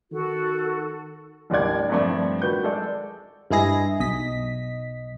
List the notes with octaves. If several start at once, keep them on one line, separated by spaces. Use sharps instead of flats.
D#3 F#4 A4
A1 D#2 G3 D4 D5 G#6
G2 A#2 F3 A3 C4 D4
D#3 F#4 B4 G6
G#3 A4 D5
G2 G#3 E4 G#4 A#6
B1 D#5 B6